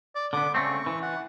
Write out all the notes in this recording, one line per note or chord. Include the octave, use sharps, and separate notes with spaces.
D5
D3 B3 D6
C#3 A3 C4 C#6
E3
F#5